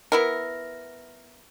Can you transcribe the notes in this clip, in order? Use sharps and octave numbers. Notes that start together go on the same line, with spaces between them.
B3 E4 A#4